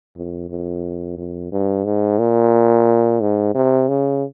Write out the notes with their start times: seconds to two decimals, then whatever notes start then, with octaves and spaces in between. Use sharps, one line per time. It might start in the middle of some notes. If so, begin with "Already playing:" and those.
0.16 F2
0.49 F2
1.17 F2
1.52 G2
1.85 G#2
2.19 A#2
3.21 G#2
3.54 C3
3.89 C#3